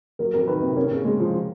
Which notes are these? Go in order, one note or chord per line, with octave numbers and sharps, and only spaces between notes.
F#3 A#4
F2 A#4
D#3 B4
C3
C#4 A#4
C#3
G#3
F3